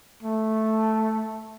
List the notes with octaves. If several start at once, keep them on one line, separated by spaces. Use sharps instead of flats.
A3